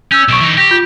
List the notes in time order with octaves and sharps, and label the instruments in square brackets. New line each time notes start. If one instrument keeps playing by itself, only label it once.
[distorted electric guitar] C#4 [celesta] E6 G6
[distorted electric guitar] B1 [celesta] C#6 D7 E7
[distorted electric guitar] E3 D#4
[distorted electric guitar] G4 [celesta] A#6
[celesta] F4 G6